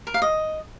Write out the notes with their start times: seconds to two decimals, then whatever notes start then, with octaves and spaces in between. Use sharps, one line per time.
0.07 A#4
0.14 F5
0.22 D#5